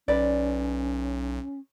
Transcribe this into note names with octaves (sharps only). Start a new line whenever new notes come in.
B1 C#4 B4 D5